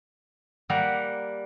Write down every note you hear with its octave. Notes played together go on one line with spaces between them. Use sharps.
G3 A#3 F#5 A#5